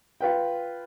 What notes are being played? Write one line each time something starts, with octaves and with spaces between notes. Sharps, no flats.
F4 B4 G5